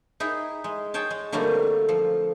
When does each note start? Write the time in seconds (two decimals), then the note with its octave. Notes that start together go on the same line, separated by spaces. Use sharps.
0.20 D#4 E4 G#4
0.64 G#3
0.94 G#4 C#5 G5 A5
1.10 G#3
1.32 D3 F#3 G3 A3 A#3 C4
1.89 F3